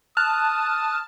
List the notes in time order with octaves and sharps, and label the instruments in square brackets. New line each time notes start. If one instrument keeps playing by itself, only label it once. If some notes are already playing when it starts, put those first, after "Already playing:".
[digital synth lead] A5 [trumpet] D#6 [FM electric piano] F6 [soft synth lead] F#6